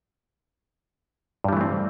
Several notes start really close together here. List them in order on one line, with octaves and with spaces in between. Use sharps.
G2 G3 E3 A3 C4